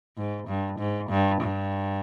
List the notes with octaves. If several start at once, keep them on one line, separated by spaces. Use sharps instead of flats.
G#2
G2
G#2
G2
G2